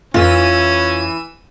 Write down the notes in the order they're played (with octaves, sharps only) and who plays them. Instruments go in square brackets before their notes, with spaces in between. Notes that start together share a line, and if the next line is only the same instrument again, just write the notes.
[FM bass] F2 [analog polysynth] E3 E6 D#7 [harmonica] C#4 [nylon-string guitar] F4